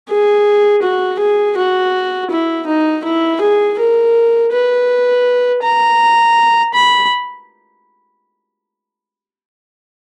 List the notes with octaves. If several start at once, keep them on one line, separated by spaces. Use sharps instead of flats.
G#4
F#4
G#4
F#4
E4
D#4
E4
G#4
A#4
B4
A#5
B5